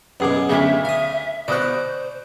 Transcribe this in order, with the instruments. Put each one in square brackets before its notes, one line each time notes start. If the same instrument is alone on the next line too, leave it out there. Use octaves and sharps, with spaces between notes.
[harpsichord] F#2 B2 [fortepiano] B3 G#4 D6
[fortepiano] D2 C#3 [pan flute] E5
[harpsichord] F5 D#6
[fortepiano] B2 D#6 F#6 [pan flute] C5 [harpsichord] D5 C#6